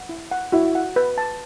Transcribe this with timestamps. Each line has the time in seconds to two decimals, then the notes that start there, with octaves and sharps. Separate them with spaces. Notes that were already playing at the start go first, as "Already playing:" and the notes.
Already playing: F#5
0.09 E4
0.31 F#5
0.52 E4 F#4
0.75 F#5
0.96 B4
1.18 A5